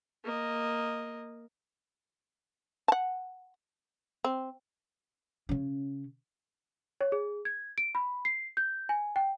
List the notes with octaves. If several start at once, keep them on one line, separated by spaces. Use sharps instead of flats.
A#3 D#5
F#5 A5
C4
C#3 C#4
C#5
G#4
G#6
D7
B5
C7
G6
G#5
G5